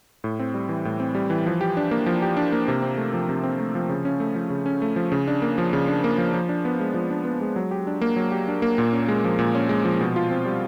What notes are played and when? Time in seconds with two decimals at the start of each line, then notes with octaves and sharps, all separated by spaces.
0.24 A2
0.39 C4
0.54 G3
0.69 E3
0.85 A2
1.00 C4
1.15 G3
1.30 E3
1.46 F3
1.61 G4
1.77 D4
1.91 A#3
2.06 F3
2.22 G4
2.37 D4
2.52 A#3
2.68 C3
2.82 C4
2.98 A3
3.13 F3
3.29 C3
3.43 C4
3.59 A3
3.75 F3
3.89 C#3
4.05 C#4
4.20 A3
4.35 F3
4.50 C#3
4.66 C#4
4.82 A3
4.96 F3
5.12 C#3
5.28 D4
5.42 A#3
5.58 F3
5.73 C#3
5.88 D4
6.04 A#3
6.18 F3
6.34 F3
6.49 D4
6.65 B3
6.80 G#3
6.94 F3
7.10 D4
7.25 B3
7.41 G#3
7.56 F#3
7.71 G4
7.87 D4
8.01 A#3
8.16 F#3
8.32 G4
8.48 D4
8.62 A#3
8.78 A#2
8.93 C#4
9.08 G#3
9.24 F3
9.39 A#2
9.55 C#4
9.69 G#3
9.85 F3
10.01 B2
10.16 F4
10.31 C4
10.46 G3